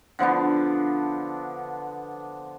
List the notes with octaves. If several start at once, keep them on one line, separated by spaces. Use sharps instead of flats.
D3 F3 B3 D4